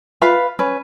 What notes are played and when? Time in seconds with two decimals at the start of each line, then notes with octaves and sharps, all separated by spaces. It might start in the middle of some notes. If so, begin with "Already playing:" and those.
0.21 F4 B4 F5 B5
0.59 C#4 B4